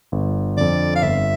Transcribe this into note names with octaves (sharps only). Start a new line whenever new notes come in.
G1
F2 D3 D5
F5
G1 E5